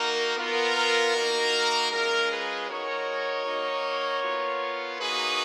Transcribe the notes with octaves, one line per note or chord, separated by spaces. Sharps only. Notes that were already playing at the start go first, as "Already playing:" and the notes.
Already playing: A#3 D#4 F#4 A#4
B3 F4 A#4
A#3 D#4 F#4
G#3 C#4 F4 A#4
G#4 B4
G#3 D#4 F#4 A#4 C#5
A#3 D#4 F#4
B3 F4
A#3 D#4 F#4 G#4 B4